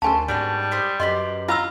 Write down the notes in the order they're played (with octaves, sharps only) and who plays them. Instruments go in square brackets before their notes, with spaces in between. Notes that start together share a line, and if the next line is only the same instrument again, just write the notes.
[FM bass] D2 [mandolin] C#4 A4 C5 [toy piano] A#4 G#5 A5
[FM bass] G#2 [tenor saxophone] G3 [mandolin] B3 D4 F#4
[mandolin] G4 C5 D#6
[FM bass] F#2 [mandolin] G4 B4 C6 [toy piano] D#5
[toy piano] E4 B5 E6 [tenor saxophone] F4 [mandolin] A#5